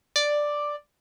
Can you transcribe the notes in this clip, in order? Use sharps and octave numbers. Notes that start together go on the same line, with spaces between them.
D5